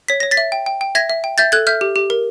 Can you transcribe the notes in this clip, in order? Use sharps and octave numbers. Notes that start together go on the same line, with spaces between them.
C#5 B6
C#5 A#6
A6 B6
E5
G5
G5
G5
E5 G#6 A#6
E5
G5
E5 G6 A6
A4 F#6 G#6
E5 F6 G6
G4
G4
A#4